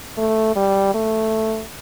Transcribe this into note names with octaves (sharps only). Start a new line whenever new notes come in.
A3
G3
A3